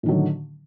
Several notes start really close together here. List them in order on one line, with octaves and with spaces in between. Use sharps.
A2 D#3 F#3 D3